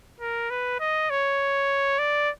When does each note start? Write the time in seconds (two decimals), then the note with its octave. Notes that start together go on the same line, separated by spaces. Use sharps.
0.20 A#4
0.50 B4
0.80 D#5
1.10 C#5
1.99 D5